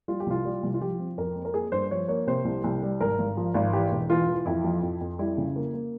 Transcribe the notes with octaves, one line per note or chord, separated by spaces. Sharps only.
G3 F4
G4
C2 F4
G3
C2
F4
F3 G4
C4
F2 A#4
C4
A#4
A#3 G#4
G2 C5
F3 C#5
A#3 C#5
C3 C5
C2
C2
G3
G#1 A#4
G#1
F3
G#1
E3 G4
E1
E3 F4
E3
F2 E4
F3
F2
F2
G3 E4
C#3
A#3
A#3